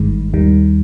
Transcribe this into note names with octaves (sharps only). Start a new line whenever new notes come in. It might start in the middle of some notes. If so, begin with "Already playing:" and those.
Already playing: G#1 G2 D#3 G#3
D#2 D#3 G3